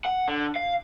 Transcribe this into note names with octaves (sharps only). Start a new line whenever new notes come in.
F#5
D3
F5